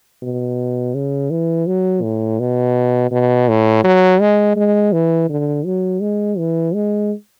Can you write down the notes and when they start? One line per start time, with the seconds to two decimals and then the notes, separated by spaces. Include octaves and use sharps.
0.22 B2
0.94 C#3
1.31 E3
1.67 F#3
2.03 A2
2.40 B2
3.11 B2
3.49 A2
3.84 F#3
4.21 G#3
4.56 G#3
4.93 E3
5.29 D3
5.66 F#3
6.01 G#3
6.38 E3
6.74 G#3